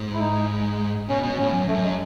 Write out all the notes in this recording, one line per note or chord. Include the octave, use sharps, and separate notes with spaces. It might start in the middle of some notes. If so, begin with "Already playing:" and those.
Already playing: G#2
E4
D#4
B2 C#4
B2
A2 C#4
F#2
F#2 A3
G#3